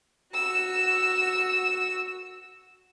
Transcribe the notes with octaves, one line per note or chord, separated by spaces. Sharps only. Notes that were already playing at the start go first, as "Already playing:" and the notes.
F#4 E6